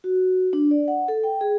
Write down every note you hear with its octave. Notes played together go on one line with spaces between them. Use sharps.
F#4
D4
D5
F#5
A4
G5
G#4